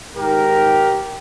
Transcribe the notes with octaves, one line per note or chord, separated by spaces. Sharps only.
G#2 D#3 G4 A#4